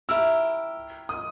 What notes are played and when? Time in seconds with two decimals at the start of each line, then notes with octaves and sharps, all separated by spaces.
0.09 E4 G4 A#4 E6
1.09 D#6